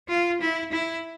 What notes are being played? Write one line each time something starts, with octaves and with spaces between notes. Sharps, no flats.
F4
E4
E4